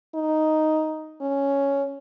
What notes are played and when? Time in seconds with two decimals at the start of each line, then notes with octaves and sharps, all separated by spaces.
0.15 D#4
1.21 C#4